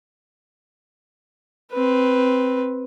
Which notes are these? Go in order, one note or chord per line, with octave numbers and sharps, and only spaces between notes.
C4 B4